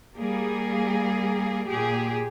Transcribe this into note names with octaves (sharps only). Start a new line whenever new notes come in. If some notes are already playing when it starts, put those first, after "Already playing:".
G3 A#3 G#4
A#2 G4 G#4